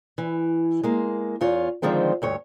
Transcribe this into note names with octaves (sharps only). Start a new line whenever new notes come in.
E3
G#3 A#3
E2 F4 C#5
D3 D#3 F3 G#3 C4
D2 G2 C#5